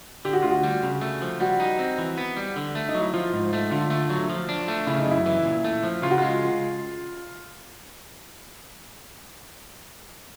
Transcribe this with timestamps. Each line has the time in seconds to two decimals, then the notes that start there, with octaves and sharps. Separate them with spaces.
0.25 D3 G4
0.33 F#4
0.43 D2 F4
0.51 F#4
0.63 G3
0.83 C#3
1.01 A3
1.22 F3
1.40 G3 F#4
1.60 D#4
1.79 C4
1.98 E3
2.18 B3
2.37 G3
2.56 D3
2.75 A3
2.89 D#4
2.95 F#3
3.01 E4
3.14 F3 F4
3.33 G#2
3.53 A3
3.71 D3 F4
3.90 A3
4.10 F#3
4.29 F3
4.49 D4
4.68 A3
4.87 C#3 E4
5.00 D#4
5.06 F#2
5.11 E4
5.26 E3
5.45 A#2
5.64 A3
5.83 F3
6.02 C#3 F4
6.10 F#4
6.18 G#3 F4